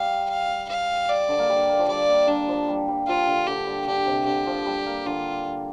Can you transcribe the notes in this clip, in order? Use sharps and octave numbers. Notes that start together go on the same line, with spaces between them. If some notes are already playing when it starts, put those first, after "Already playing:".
Already playing: G3 F5
F5
F5
D5
D3
A#3
G3
A#3
F3
G3 D5
A#3
G3 D4
F3
G3
G3
F3 F4
D3
D3 G4
G3
D3 G4
C3
D3 G4
F3
G3
A#3
D3 F4